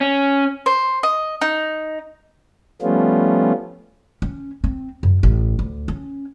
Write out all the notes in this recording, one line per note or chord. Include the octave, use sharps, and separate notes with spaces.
C#4
C5
D#5
D#4
F3 G3 A3 B3 C#4 F4
C#4
C4
F#2
A1
D2
C#4